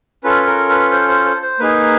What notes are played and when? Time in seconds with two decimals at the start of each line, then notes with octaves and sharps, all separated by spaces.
0.24 C#4 F4 A4 B4
0.47 A#4
0.69 B4
0.91 C5
1.08 C5
1.25 C5
1.42 C5
1.59 A#3 D#4 G#4 B4